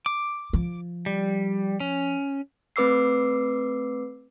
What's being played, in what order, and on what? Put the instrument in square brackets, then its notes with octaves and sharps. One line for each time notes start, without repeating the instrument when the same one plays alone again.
[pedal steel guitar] D6
[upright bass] F3
[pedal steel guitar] G3
C#4
[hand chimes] A3 C4 B4 D6 E6 C7